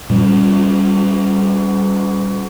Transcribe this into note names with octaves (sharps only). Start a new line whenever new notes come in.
A#2 G3 A#3 C#4